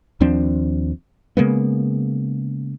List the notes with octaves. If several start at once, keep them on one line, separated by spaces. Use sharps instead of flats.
D#2 F3 C4 D4
C#3 G#3 A#3 B3